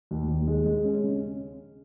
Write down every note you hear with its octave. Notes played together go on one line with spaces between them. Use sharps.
D#2
D#2
G#3
G#3
C#4
C#3